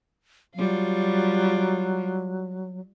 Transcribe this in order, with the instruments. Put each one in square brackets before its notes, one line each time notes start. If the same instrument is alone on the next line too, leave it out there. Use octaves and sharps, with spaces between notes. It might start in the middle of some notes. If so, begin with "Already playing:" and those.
[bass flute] F#3 [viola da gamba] G3 F4